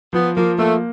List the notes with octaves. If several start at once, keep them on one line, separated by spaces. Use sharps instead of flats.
F3 B3
F3 A#3
A3 A#3